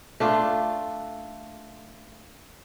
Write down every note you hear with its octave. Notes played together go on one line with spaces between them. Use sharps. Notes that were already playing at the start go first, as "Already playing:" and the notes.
A3 D4 F4